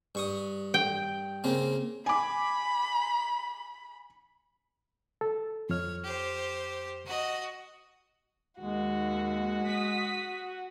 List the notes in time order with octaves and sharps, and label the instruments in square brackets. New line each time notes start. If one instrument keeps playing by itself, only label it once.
[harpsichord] G2 C#6 D#6
[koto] G5
[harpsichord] C#3 A#3 C4
[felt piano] G#5 D6 [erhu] B5
[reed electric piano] A4
[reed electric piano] F2 F6 [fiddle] C#5
[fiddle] G4 C5
F#4 D#5
[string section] D#2 [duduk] G#3 [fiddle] F#4
[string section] D#6 B6